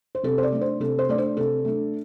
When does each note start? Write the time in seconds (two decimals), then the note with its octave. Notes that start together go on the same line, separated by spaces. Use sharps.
0.15 C5
0.23 C3 A4
0.38 C5
0.43 D5
0.52 A3 D4
0.61 C5
0.80 C3 A4
0.99 C5
1.09 A3 D4 D5
1.18 C5
1.37 C3 A4
1.65 A3 D4